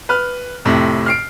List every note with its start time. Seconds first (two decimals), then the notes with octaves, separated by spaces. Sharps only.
0.09 B4 F6
0.65 F2 A2 C3
1.06 F6 C7 D7